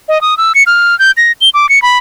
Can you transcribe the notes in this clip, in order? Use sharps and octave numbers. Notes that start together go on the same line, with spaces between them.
D#5
D#6
E6
C#7
F6
G6
A#6
G7
D6
C#7
B5